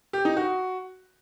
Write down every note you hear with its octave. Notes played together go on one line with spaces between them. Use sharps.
G4
D#4
F#4